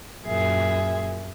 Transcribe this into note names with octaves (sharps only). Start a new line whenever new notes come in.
F#2 A#2 G#4 E5